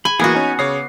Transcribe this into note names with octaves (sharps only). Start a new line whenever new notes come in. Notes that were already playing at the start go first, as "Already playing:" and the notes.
G#5 B5
E3 A#3 B3 F#4 G#4
C#4 D#4 G#5
C#3 C#5 D6 D#6 C7